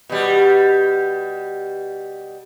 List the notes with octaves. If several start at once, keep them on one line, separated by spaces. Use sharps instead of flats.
B2 G3